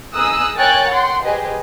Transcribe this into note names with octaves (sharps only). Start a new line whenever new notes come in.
D#4 G#4 D#6 E6 F#6
A#4 C#5 G5 G#5 F#6 A6
F#5 G5 C6
G4 G#4 B4 C5 D#5